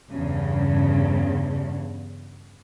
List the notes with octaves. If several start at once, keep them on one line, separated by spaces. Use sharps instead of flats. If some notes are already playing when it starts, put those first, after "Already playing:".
E2 G2 C#3